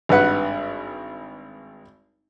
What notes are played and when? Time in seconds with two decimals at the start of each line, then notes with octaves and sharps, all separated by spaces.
0.09 G#1 G2 B4 F#5